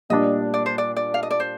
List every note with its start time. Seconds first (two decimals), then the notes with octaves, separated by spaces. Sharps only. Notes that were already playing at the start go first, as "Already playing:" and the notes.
0.10 A#2 G3 D4 D#5
0.54 D5
0.66 C5
0.78 D5
0.97 D5
1.14 F5
1.23 D#5
1.31 D5
1.40 C5